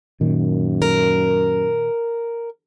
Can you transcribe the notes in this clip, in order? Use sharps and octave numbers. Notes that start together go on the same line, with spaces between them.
F#2 A#2 D#3
A#4